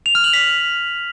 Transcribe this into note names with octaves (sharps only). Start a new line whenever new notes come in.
F7
F6
F#7
B6